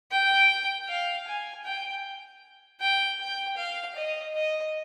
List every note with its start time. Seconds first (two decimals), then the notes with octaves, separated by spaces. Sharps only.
0.11 G5
0.88 F5
1.27 G#5
1.65 G5
2.80 G5
3.20 G5
3.57 F5
3.96 D#5
4.35 D#5